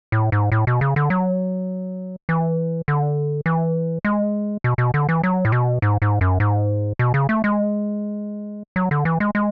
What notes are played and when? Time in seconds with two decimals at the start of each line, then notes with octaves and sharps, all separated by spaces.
0.12 A2
0.32 G#2
0.52 A2
0.67 B2
0.81 C#3
0.96 D3
1.10 F#3
2.29 E3
2.88 D3
3.46 E3
4.05 G#3
4.64 B2
4.78 B2
4.94 D3
5.09 E3
5.23 F#3
5.45 A2
5.52 B2
5.82 G#2
6.02 G#2
6.21 F#2
6.40 G#2
6.99 B2
7.14 C#3
7.29 A3
7.44 G#3
8.76 F#3
8.91 D3
9.05 E3
9.20 G#3
9.35 G#3